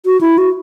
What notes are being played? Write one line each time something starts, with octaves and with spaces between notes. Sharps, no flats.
F#4
E4
F#4